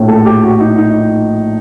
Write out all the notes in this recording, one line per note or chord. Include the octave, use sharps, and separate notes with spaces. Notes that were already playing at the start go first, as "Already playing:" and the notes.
Already playing: A#1 A2 A3
A4
G4
F#4
D#4
D#4